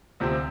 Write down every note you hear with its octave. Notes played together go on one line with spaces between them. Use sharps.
D2 C3 F3 C4